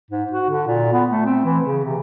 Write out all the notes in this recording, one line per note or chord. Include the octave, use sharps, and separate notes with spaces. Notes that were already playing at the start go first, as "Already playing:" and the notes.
G#2
F#4
D3
A#2
B3
A3
C4
E3
C#3
C3